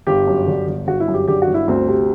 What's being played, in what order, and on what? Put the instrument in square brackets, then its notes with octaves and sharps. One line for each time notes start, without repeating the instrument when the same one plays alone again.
[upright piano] G1 G4
F#2
D3
G1
G1 F#4
E4
F#2
G4
D3 G4
F#4
G1
E4
D2 C4
C3